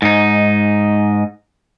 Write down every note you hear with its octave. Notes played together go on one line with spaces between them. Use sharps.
G#2 D#4